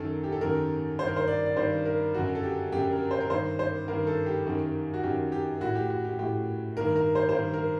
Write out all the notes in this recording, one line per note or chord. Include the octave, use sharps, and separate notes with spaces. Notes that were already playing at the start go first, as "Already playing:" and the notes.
Already playing: F#2 D#3 A4
G4
A4
F#2 D#3 A#4
G2 D#3 C5
A#4
C5
D5
D5
G2 D#3 C5
A#4
F#2 D3 F#4
A4
G4
F#2 D3 G4
A#4
C5
A#4
G2 D#3 C5
C5
G2 D#3 A#4
A4
G4
F#2 D#3
F#4
F#2 D#3 G4
G4
A2 F#4
G4
F#4
G4
A2 G4
G2 D#3 A#4
A#4
C5
C5
G2 D#3 A#4
A#4